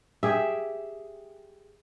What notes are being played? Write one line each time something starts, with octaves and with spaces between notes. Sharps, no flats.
G4 G#4 E5